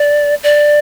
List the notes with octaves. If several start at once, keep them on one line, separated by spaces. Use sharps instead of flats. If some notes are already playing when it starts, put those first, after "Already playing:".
Already playing: D5
D5